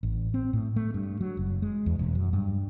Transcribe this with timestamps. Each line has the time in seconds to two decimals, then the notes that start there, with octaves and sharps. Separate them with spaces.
0.03 A1
0.34 C4
0.53 A2
0.76 A3
0.94 G2
1.21 F#3
1.37 F#1
1.62 G#3
1.86 E2
1.99 E1
2.15 F#2
2.33 G2